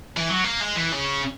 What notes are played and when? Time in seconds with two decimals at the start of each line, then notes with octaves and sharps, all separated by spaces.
0.17 E3
0.29 F#3
0.44 A#3
0.61 G#3
0.76 E3
0.92 C#3